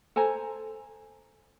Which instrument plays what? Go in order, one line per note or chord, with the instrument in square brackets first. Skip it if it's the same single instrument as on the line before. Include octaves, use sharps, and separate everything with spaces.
[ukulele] A4 C5 G#5 A#5